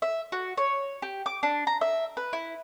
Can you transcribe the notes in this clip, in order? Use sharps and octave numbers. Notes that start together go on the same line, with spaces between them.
E5
F#4
C#5
G4
D6
D4
A#5
E5
B4
E4